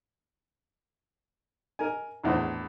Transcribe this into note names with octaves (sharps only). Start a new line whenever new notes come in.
A#4 G#5
A#1 E2 A2 C5